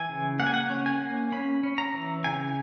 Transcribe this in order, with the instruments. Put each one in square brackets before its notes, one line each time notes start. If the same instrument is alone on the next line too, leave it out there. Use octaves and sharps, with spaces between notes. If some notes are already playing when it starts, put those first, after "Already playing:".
Already playing: [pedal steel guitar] E3 G#5
C#3
A#3 F#5
G#5
F#5
C#4
G#5
A#3
C#4 B5
C#4
A#5
E3
C#3 G#5